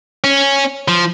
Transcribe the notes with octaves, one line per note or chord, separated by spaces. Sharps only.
C#4
F3